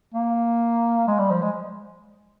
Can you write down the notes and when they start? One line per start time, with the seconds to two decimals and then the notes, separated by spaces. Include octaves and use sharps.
0.14 A#3
1.08 G#3
1.19 G3
1.31 F3
1.42 G#3